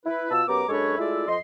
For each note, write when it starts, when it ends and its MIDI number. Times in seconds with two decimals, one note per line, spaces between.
0.06 0.29 64
0.06 0.29 71
0.31 0.43 47
0.31 0.43 65
0.31 0.43 81
0.31 0.43 88
0.48 0.64 42
0.48 0.64 59
0.48 0.64 67
0.48 0.64 82
0.48 0.64 86
0.69 0.95 42
0.69 0.95 56
0.69 0.95 62
0.69 0.95 69
0.69 0.95 71
0.69 0.95 73
0.97 1.27 56
0.97 1.27 57
0.97 1.27 64
0.97 1.27 65
0.97 1.27 74
0.97 1.27 76
1.28 1.37 41
1.28 1.37 75
1.28 1.37 84